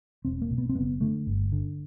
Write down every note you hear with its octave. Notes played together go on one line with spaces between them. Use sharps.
E1 C4
A#3
B2
B3
C4
F#1 B3
D3 A3
G1
D3